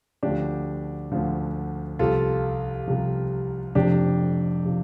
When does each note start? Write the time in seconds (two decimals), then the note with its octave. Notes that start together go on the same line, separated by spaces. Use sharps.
0.23 D2 D3 F3 D4 G4
1.12 D2 D3 F3
1.99 C2 C3 F3 F4 A4
2.88 C2 C3 F3
3.75 F1 F2 C3 F3 D4 G4
4.65 C3 F3